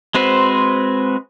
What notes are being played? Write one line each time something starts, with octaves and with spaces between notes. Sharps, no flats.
G#3 C4 F#4 B4 C5